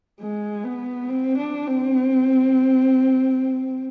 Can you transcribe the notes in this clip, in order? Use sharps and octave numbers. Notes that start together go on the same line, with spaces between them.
G#3
B3
C4
D4
C4